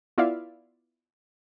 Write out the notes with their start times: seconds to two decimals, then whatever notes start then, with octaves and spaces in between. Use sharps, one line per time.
0.18 B3 E4 F4 D5 E5 F5